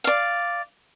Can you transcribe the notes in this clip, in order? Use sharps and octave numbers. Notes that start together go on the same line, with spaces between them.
D5 F5